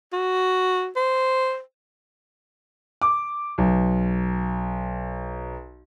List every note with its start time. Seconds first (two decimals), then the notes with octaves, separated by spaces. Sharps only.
0.13 F#4
0.96 C5
3.02 D6
3.58 B1